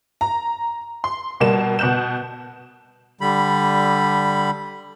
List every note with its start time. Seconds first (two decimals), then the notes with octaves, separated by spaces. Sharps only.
0.21 A#5
1.04 C6
1.40 B2 G3 A#3 E7
1.79 B2 B3 F#6 G6 E7
3.21 D3 G3 B5